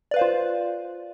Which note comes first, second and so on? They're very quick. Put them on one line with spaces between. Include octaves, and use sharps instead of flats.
D5 B4 F5 C5 F4